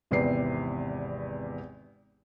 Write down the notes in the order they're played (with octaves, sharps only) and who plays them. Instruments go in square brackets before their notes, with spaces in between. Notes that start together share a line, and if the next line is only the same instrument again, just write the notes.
[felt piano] G#1 E2 C3 B4 D5 C7